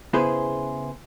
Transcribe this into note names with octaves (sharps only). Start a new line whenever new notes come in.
C#3 B3 E4 G#4 B4 C5